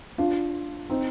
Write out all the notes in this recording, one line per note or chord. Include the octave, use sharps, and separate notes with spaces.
D4 F4
C4 D#4